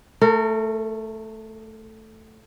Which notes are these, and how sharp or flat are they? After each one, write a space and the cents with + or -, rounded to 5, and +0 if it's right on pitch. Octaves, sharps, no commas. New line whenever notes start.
A3 +0 A#4 -35